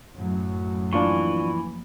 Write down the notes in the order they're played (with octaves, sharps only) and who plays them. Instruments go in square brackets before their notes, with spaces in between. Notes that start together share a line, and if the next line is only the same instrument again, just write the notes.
[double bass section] F#2 A2 F#3
[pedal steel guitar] E3 [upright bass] F3 A#3 [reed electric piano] D4 F4 C#6